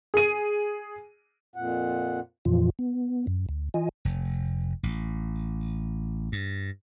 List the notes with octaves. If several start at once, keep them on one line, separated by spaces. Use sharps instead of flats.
G#4 D#7
F2 A#2 F#5
F2 A#2 E3 F3 F4
B3
F#2
D2
E3 F4 D#5 G#5
F1
A1
G2